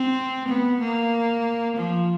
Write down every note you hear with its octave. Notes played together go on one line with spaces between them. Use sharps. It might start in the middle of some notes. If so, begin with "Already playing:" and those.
Already playing: C4
B3
A#3
F3